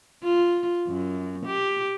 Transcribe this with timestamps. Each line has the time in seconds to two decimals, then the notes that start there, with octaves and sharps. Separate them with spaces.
0.23 F4
0.88 F#2
1.46 G4